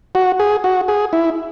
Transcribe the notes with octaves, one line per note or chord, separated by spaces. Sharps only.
F#4
G#4
F#4
G#4
E4